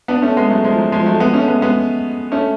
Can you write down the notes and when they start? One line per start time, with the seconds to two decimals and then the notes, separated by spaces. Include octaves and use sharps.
0.08 B3 D4
0.22 A3 C#4
0.37 G#3 B3
0.50 F#3 A3
0.64 F3 G#3
0.78 F#3
0.92 F3 G#3
1.06 F#3 A3
1.20 G#3 B3
1.34 A3 C#4
1.48 G#3 B3
1.62 G#3 B3
2.32 A3 C#4